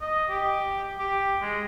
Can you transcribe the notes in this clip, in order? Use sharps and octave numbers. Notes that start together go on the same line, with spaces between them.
D#5
G4
G4
G#3